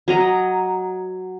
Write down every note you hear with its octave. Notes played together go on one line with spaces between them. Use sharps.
F#3 D#5 A#5